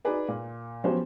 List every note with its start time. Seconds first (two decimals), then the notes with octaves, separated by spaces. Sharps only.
0.05 D#4 F#4 G#4 B4 D5
0.28 A#2
0.84 F3 F#3 B3 C#4 G4 C5